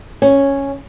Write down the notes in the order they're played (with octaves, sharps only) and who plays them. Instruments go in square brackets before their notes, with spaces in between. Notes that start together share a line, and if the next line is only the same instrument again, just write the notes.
[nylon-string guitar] C#4